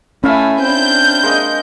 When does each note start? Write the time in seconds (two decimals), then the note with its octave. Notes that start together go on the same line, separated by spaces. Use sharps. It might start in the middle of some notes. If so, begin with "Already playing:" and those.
0.24 A3 C#4 E4 F5 G#5 B5
0.61 C4 D4 G6
1.23 G#3 A#3 D#5